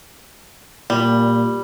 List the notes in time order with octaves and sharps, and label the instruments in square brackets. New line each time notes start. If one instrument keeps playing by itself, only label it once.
[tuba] A#2 [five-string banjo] G3